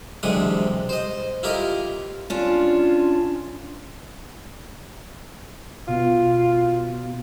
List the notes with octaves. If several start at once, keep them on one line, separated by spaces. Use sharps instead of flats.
B1 C3 E3 G#3 D4 D#6
C5 D#5
E4 F4 G4 A#4 D#5
C#4 D4 F4
B2 F4